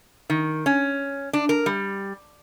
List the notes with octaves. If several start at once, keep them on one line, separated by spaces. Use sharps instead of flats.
D#3
C#4
D4
A#4
G3